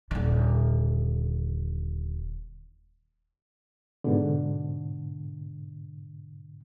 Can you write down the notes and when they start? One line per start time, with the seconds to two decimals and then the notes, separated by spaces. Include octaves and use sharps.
0.11 D#1 D3
4.04 G#2 B2 D3